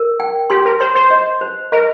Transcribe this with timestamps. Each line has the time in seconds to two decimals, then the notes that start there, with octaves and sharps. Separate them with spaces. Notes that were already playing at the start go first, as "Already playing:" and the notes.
Already playing: A#4
0.20 G5
0.50 G4 C6
0.65 A#4
0.80 C5 C6
0.95 C5
1.10 D#5
1.41 C5
1.72 A#4 D#5